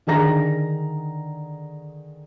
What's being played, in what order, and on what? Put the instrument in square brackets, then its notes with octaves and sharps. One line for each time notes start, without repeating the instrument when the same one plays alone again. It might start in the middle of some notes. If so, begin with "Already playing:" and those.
[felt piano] D3 D#3 G#4 A#5 A#6